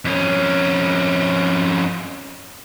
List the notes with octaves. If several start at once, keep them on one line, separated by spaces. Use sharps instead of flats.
F2 C#4